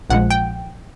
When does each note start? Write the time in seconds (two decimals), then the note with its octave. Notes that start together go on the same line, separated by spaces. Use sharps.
0.10 A#1 A#2 F3 G#3 F#5
0.30 G5